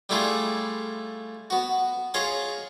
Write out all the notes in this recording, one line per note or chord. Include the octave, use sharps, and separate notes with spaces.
G3 A3 E4 F4 G#4
B3 F#4
F4 G#4 C#5 D#5